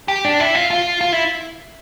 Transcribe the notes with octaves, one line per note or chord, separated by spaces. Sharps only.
G4
D4
E4
F4
F4
F4
E4